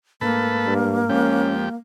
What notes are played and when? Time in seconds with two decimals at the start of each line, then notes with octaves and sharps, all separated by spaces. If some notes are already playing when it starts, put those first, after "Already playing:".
0.21 G#2 A3 A#3 D4 A4 B4
0.66 G2
1.09 F2 G#3 C#4 G4